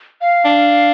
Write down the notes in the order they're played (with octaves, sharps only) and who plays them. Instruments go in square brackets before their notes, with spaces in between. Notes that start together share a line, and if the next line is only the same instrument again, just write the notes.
[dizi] F5
[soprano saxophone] D4